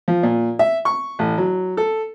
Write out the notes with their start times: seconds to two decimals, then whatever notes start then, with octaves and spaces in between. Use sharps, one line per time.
0.08 F3
0.23 A#2
0.59 E5
0.85 C#6
1.19 A1
1.38 F#3
1.77 A4